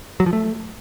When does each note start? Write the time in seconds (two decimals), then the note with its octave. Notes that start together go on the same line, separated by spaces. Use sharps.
0.20 F#3
0.26 F3
0.33 A3